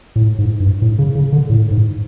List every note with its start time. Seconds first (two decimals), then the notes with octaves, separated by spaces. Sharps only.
0.16 A2
0.39 G#2
0.60 G2
0.82 A2
0.99 C#3
1.15 C#3
1.32 D3
1.50 A2
1.71 G#2